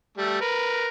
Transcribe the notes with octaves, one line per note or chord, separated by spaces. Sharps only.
G3 A3
A#4 B4